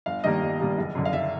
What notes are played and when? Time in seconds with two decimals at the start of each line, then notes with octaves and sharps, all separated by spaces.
0.06 G1 F5
0.24 G2 D#3 G3 A#3 D#5
0.42 G1
0.60 G2 D#3 G3 A#3
0.78 F#1
0.95 F#2 D3
1.05 F5
1.13 F#1 E5